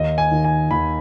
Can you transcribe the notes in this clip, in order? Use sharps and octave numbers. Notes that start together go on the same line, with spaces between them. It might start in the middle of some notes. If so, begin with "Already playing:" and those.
Already playing: D#2 D#5
G#5
D#3
G#5
D#2 B5